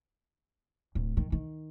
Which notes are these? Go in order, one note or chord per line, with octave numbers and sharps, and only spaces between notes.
D1
D#3
D#3